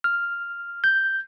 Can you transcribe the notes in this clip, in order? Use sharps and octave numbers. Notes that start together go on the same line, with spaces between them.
F6
G6